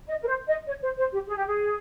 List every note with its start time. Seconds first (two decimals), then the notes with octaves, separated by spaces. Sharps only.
0.07 D#5
0.21 A#4
0.27 C5
0.47 D#5
0.67 C#5
0.82 C5
0.98 C5
1.13 G4
1.27 G#4
1.37 G4
1.46 G#4